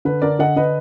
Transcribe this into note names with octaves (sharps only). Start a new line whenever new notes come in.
D3 B4
D3 A#4 D5
D3 D#5 F#5
D3 B4 D#5